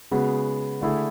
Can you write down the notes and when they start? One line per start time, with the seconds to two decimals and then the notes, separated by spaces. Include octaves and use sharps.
0.11 C#3 G#3 B3 F#4
0.81 D3 A3 E4 G#4